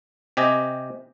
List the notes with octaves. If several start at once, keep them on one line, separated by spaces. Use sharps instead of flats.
C3 G4 D#5 G#5